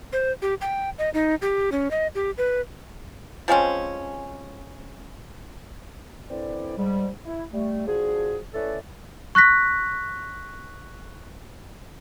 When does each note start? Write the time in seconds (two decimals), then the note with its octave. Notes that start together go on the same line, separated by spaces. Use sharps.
0.13 C5
0.42 G4
0.61 G5
0.98 D#5
1.14 D#4
1.42 G4
1.72 C#4
1.91 D#5
2.15 G4
2.38 B4
3.48 F3 G#3 C4 C#4
6.30 D3 E3 C4 E4 D5
6.77 G#2 G3
7.26 E4
7.53 G3 A3
7.87 F3 D4 F#4 G#4
8.54 A3 C#4 E4 A4 B4 D5
9.35 C#6 F#6 A#6 B6